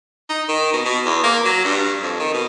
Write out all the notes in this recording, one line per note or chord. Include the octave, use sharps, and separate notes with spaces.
D#4
D#3
B2
B2
E2
A#3
F#3
G2
F2
D#3
B2